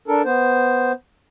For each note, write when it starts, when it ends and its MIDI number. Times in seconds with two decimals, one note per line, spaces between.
0.08 0.22 62
0.08 0.22 69
0.08 0.22 70
0.25 0.92 59
0.25 0.92 72